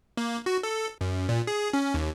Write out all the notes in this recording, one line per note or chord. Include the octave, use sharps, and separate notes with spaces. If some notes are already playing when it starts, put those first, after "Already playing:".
A#3
F#4
A4
F#2
A#2
G#4
C#4
D#2